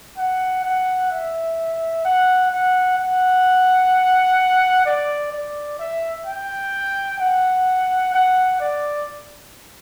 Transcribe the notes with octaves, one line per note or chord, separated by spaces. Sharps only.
F#5
F#5
E5
F#5
F#5
F#5
D5
D5
E5
G5
F#5
F#5
D5